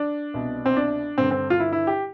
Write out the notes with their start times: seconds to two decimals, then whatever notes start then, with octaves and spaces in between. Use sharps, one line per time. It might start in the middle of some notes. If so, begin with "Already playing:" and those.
Already playing: D4
0.34 C2 B2
0.66 C4
0.77 D4
1.18 G2 D3 C4
1.31 C4
1.50 F4
1.60 E4
1.72 E4
1.87 G4